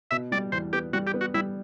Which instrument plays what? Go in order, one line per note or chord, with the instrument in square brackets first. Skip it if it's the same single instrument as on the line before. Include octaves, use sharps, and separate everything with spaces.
[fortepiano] B2 [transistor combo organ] E5
[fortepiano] G3 [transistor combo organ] D5
[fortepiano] E2 [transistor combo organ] C5
[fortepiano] B3 [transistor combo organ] G4
[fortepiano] G3 [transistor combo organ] F#4
[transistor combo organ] G4
[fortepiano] B3
[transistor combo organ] F#4
[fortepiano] G3 [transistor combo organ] E4